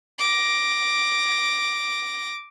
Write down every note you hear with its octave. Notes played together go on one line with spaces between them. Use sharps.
D6 A#6